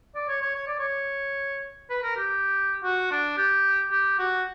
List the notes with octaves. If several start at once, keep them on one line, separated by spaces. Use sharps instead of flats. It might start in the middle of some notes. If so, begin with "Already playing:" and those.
D5
C#5
C#5
C#5
D5
C#5
B4
A#4
G4
F#4
D4
G4
G4
F#4